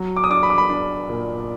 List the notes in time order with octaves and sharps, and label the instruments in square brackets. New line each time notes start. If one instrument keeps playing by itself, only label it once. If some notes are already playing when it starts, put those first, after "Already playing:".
Already playing: [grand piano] F#3
D6
D#6
D4 D6
B5
D6
B5
D4
A#2